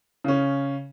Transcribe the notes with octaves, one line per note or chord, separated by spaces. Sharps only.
C#3 C#4